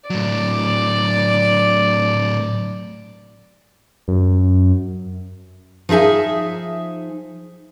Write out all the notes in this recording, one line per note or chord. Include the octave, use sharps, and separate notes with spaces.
A2 F#3 D5
F#2
F3 D#4 G#4 E5 G#5